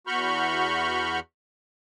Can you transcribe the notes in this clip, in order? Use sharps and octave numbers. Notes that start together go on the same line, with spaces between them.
E2 F#4 B5 C#6 F6 G6